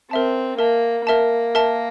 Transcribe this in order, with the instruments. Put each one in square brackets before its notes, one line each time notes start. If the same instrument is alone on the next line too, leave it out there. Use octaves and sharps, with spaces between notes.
[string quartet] C4 [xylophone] A#4 E5 A5
[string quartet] A#3 [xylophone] A#4 E5 A5
[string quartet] A#3 [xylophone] A#4 E5 A5
[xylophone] A#4 E5 A5